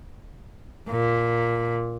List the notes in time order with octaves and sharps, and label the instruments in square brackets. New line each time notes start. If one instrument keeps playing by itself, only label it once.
[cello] A#2